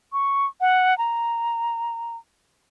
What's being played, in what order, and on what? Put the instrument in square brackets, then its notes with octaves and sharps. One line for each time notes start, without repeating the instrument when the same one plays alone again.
[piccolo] C#6
F#5
A#5